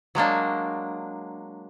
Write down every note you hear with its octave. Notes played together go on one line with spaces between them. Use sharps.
F#3 G#3 A#3 D4